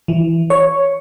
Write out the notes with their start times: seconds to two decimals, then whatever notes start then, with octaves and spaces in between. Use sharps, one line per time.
0.08 E3
0.50 C#5